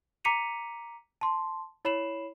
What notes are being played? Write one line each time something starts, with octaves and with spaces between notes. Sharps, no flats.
A#5 D6 B6 C#7 D#7 F7
A5 C6
E4 C#5 B5 C7 E7 F#7